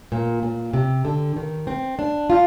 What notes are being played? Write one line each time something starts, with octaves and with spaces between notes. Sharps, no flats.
A#2
A#2
C3
D3
D#3
C4
D4
F4